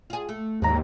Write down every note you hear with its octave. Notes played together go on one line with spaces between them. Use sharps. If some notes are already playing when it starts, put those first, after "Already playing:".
F4 G#4
A3
D#2 G#2 F#3 C4 A#5